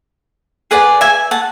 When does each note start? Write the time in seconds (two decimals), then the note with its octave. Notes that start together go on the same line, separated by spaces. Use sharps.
0.71 G#4 B4 D5 F#5
1.01 E5 G#5
1.31 F#5 A5